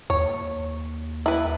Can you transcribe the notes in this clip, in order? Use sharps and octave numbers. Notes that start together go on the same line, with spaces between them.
D#2 C#5
E4 B4